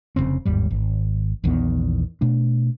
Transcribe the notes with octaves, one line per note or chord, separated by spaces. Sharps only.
F1 C#2 C#3 C4
G1 D#2 G#2 G3
G#1
A#1 E2 D#3 B3
B2 A3 D4